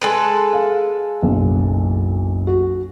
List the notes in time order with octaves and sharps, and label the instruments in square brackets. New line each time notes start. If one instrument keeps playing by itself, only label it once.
[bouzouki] G#3 A4 B4
[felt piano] F5
F#1 B1
F#4